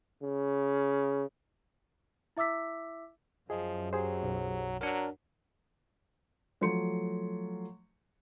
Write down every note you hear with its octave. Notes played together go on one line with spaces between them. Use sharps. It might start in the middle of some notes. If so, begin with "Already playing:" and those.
C#3
E4 E5 D6 E6 B6
F#2 F3 G#4 D#5
F#3 G4 G#4 C5
B1
F#3 D4 A#4
F3 F#3 A3 C6 C#7